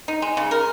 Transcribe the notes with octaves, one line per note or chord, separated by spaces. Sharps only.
D#4
G#3
C#3
A#4